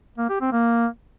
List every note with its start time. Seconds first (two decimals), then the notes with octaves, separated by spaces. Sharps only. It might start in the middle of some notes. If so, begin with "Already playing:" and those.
0.18 A#3
0.29 G4
0.41 C4
0.52 A#3